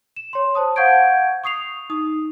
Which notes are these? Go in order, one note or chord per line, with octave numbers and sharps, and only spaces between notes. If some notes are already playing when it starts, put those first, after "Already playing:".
E7
C#5 C6
C5 A5 D#6
F5 F#5 C#6 G6 G#6 D7
C#6 D#6 C7 F7
D#4 D#6